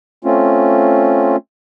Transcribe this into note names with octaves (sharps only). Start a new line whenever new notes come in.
A3 C4 C#4 F4